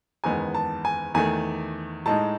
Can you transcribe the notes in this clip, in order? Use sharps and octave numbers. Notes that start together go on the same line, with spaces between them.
F#1 E2 D#3 G#3 B3 G#5
A5
G#5
E2 D#3 A3 G#5
A2 G#3 D#4 A5